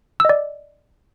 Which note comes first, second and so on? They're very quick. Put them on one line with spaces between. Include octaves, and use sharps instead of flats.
E6 D#5 D5